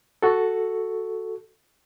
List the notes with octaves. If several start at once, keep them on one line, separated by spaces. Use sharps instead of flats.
F#4 A4